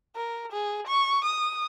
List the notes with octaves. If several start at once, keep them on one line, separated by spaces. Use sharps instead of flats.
A#4
G#4
C#6
D#6